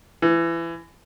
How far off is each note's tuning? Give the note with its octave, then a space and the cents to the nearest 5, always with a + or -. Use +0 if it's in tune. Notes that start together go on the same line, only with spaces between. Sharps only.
E3 +25